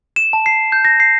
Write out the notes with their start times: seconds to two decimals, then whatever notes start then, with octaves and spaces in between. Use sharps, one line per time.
0.16 E7
0.33 A5
0.46 C7
0.72 G6
0.85 A#6
1.00 C7